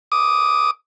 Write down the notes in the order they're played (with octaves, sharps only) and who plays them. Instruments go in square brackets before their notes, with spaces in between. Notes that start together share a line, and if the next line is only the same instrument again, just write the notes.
[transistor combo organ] D6 D#6